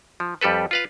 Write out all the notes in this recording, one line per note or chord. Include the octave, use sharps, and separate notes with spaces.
F3
F2 G3 G4 A4 B4
F4 B4 F5